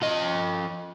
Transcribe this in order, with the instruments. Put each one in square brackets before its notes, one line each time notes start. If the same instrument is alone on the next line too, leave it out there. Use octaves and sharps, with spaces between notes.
[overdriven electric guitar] F3 D#5